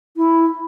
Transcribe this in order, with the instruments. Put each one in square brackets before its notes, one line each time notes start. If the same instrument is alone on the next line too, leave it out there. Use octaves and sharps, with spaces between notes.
[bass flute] E4